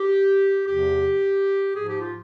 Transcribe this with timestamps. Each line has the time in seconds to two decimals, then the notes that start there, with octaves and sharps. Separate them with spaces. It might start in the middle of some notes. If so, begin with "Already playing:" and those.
Already playing: G4
0.67 E2 C3 F3 G4
1.74 G#2 F3 G#4
1.87 G4
2.00 F4